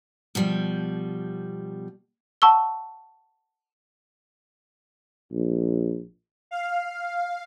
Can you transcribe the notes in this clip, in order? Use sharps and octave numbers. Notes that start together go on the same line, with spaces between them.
B2 F3 G3
F#5 A5 C#6 E6 G7
A#1
F5